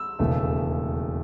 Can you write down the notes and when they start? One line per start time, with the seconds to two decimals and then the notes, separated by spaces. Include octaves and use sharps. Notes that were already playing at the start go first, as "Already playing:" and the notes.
Already playing: E6
0.19 E1 D#2 C#3 E3 A3